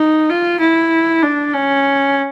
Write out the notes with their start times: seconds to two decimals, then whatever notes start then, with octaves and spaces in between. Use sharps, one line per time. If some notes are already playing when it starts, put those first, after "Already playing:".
Already playing: D#4
0.29 F4
0.60 E4
1.22 D4
1.53 C#4